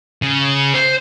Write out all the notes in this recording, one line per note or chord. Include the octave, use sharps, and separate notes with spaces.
C#3
C5